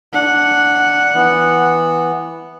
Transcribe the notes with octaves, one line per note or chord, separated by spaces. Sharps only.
D4 F#5
E3 B3